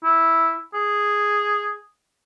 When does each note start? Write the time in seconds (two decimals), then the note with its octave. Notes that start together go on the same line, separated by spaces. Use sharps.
0.04 E4
0.74 G#4